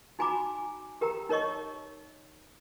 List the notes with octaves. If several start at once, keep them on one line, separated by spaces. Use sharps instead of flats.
D#4 F#4 G#5 A#5 B5 D6
G4 A#4 G5 A#5
D#4 A#4 C#5 D#5 C#6